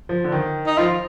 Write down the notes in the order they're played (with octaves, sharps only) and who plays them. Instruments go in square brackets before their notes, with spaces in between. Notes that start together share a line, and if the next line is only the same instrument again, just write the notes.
[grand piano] F3
D3
D#3
[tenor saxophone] D#4
[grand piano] F3 [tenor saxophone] F4